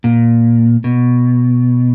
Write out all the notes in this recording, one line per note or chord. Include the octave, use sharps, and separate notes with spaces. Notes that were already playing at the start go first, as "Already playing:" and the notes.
A#2
B2